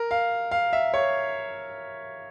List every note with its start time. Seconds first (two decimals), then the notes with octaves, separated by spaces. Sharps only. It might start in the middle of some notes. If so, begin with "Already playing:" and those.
Already playing: A#4
0.11 F5
0.51 F5
0.73 E5
0.94 C#5